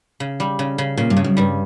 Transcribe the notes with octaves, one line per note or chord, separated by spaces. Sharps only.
C#3
G3
C#3
C#3
A#2 C#3
G2
C#3
F#2
G2 G3